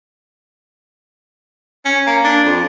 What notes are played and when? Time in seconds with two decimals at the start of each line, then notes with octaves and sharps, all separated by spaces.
1.85 C#4
2.07 A#3
2.24 D4
2.44 F2